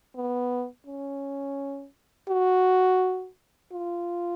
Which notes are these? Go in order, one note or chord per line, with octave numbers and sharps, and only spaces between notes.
B3
C#4
F#4
F4